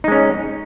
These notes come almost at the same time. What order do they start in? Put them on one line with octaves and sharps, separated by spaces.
D#4 G#3 C#4